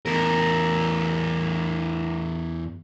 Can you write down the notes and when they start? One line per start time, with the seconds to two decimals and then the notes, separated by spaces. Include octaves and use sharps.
0.06 E2 A#4